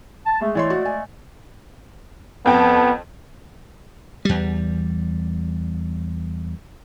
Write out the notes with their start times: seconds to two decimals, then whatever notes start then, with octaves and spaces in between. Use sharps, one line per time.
0.26 A5
0.41 G#3 A3
0.55 E3 G#3 A3 C#5 D5 C6
0.70 F#4
0.85 G#5
2.46 F2 B3 G5 A5
4.25 E2 G3